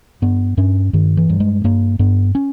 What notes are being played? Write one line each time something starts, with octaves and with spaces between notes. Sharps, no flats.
G2 B3
G2 C#4
G2 D#3
E3
G2
G#3
G2 A#3
G2 B3
C#4